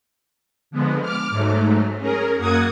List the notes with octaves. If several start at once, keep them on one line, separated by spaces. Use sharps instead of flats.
D3 F3 G#3 B3
D6 F6
G#2 F#3 A3
C#4 G#4 A#4
F#2 A#3 F#4 F#5 D#6 G#6